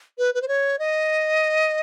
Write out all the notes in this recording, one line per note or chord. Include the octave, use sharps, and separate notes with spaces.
B4
B4
C5
C#5
D#5